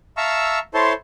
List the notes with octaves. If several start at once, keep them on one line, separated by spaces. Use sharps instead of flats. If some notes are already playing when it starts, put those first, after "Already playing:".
E5 F5 A5 A#5 C#6 E6
E4 A4 C5 C#5 A5 C6